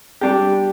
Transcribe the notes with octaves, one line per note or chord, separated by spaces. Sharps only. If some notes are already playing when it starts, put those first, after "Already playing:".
G3 D4 G4